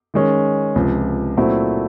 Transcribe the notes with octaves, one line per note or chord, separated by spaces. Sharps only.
D#3 G#3 C#4
C#2 C3 F3
A#2 F#3 A3 C4 E4